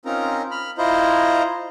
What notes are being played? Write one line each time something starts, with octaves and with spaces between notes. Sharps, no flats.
C4 C#4 D#4 F4 A#4 A#5
B5 F6
E4 F4 C5 D#5 A#5